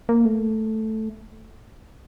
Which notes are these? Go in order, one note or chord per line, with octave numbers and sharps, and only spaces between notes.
A#3
A3